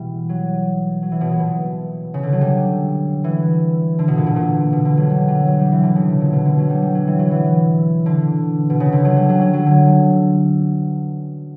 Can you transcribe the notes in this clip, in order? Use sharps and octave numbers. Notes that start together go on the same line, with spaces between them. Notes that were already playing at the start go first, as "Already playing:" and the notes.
Already playing: B2 E3 G3
F#3
F#3
E3
B2
A#2
B2
C#3
D3
F#3
G3
E3
D3
B2
A#2
B2
A#2
B2
D3
F#3
G3
F#3
F#3
G3
E3
D3
C#3
B2
A#2
B2
D3
F#3
G3
G3
F#3
E3
F#3
E3
D3
B2
C#3
D3
F#3
G3
F#3
F#3
F#3
D3